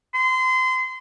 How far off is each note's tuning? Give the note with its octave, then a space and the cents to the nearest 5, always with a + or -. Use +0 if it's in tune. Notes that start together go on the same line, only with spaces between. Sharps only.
C6 -30